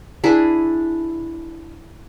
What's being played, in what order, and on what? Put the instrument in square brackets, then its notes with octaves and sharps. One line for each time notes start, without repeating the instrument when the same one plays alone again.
[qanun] D4 E4 G#4